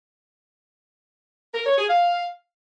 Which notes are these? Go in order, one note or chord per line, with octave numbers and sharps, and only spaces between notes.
A#4
C#5
G#4
F5